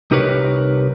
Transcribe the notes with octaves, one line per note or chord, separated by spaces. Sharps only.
C2 D#4 G4 A#4 B4 C#5